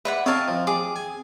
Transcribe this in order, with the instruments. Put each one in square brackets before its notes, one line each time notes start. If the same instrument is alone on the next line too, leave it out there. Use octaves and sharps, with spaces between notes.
[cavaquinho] B4 D5 F#5 [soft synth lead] E5
[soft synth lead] C4 [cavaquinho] A#4 D#5 [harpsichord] C#5 F5 A5
[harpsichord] F3
[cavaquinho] G#4 [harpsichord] D6
[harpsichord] G#5